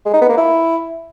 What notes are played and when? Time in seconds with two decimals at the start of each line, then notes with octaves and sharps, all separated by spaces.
0.05 G#3
0.13 D#4
0.21 B3
0.29 A#3
0.37 E4